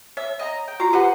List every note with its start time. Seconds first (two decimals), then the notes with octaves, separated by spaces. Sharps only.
0.17 C#5 E5
0.39 D#5 G#5 A#5
0.68 G5
0.80 F4 F#4 A#5
0.93 G4 B4 C5 F#5